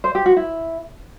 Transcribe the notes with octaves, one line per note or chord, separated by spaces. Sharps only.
C5
G4
F#4
E4